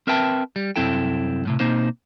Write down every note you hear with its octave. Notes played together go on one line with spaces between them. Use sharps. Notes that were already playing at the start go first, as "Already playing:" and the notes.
C4 A#4 B4 E5 G5 A5
G3
C2 F#2 C4 E4 A4 G5
F#2 A2 C3
B2 A#3 C4 D#4 C5